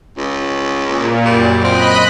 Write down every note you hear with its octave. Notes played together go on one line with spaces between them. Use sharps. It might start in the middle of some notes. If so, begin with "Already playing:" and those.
C#2
A#2
F#2 G3
C4 D#5 B5 F#6